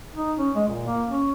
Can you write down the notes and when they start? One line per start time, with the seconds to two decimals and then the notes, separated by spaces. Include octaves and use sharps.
0.15 D#4
0.38 C#4
0.56 G#3
0.68 A#2
0.87 A#3
1.08 C#4